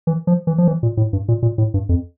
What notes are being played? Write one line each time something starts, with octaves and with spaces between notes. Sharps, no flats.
E3
F3
E3
F3
E3
A#2
A2
G2
A#2
A#2
A2
G2
F2